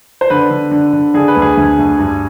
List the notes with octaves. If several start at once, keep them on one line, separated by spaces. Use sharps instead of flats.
C5
D3 B4
D3
D3
D3
D3 G#4
B4
D2
G#4
D2
D2
G2